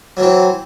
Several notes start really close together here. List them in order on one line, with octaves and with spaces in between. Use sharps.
F#3 E3 C4